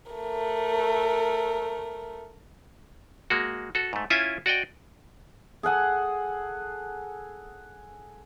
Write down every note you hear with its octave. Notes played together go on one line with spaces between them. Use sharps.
A3 A#4
G#3 A#3 F#4
F#4 A4
G#2 A3
C#4 E4 F4 E5 G#5
F#4 D5 D#5 G5
G#4 A4 F#5 G#5